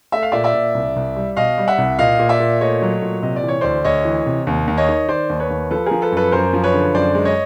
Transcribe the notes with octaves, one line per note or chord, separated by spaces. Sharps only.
A3 E5
F5
A#2 D5 E5
D5 E5
A#2
C2
C2
G3
B2 D#5 F5
G3
E5 F#5
C2
A#2 D#5 F5
A#2
D5 E5
A#2
A3 C#5 D#5
F#3
A#2
C3 D#5
D5
E3
C#5
D2 C5 D5
D2 C#5 D#5
E3
C3
D#2
D#2
C#5 D#5
D#3
D#3 C5 D5
D#2
B4 C#5
D#2
F3 A4 B4
F3 G#4 A#4
A4 B4
F#2 A4 B4
F#2 A#4 C5
F3
B4 C#5
D3
F#2 C5 D5
G#3
C#5 D#5